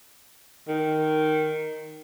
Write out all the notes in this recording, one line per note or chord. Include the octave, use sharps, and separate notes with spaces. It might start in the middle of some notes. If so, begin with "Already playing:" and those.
D#3